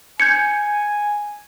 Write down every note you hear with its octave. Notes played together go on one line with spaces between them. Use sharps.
G#5 G6 G#6 C#7